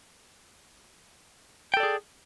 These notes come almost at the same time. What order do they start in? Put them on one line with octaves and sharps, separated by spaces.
G5 A4 D5 G#4